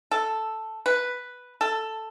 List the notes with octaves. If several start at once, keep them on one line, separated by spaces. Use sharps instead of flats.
A4
B4
A4